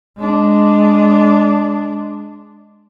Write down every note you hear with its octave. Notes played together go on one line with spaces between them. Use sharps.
G#3 D4